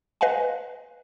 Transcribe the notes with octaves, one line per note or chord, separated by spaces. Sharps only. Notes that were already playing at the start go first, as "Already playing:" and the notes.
B4 D#5 F5 F#5 G#5